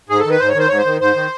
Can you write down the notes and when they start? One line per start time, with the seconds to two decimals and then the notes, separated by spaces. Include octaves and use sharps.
0.09 G#2 G#4
0.19 A4
0.25 D#3
0.30 B4
0.39 G#2 C5
0.49 C#5
0.54 D#3 C5
0.69 G#2 C#5
0.78 C5
0.86 D#3
1.00 G#2 C5
1.15 D#3